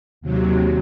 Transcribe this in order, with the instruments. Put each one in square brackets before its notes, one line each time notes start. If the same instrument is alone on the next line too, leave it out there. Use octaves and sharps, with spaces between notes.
[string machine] D#2 C3 F#3